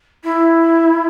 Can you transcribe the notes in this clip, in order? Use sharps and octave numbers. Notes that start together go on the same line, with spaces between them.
E4